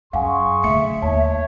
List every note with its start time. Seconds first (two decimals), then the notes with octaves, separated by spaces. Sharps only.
0.13 F#2 G#4 F5 F#5 G#5 C6 C#6
0.64 D3 A3 E5 C#7
1.02 D#2 C#5 A5